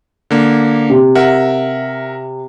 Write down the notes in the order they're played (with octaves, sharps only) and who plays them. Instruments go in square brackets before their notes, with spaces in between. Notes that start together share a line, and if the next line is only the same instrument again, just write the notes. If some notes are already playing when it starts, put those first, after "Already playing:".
[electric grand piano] D3 A#3
[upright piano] C3
[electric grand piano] A#4 E5 F#5